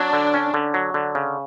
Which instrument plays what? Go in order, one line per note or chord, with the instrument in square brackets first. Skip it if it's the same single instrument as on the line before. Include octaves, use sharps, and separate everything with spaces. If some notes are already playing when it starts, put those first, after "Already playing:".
Already playing: [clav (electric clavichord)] F#3 [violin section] D4
[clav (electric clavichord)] D3
C#4
D3
F#3
D3
C#3